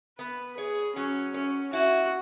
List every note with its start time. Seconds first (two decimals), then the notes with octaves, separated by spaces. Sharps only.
0.18 B3 B4
0.57 G#4 C#5
0.96 F#3 C#4
1.34 C#4 C#5
1.73 E4 F#4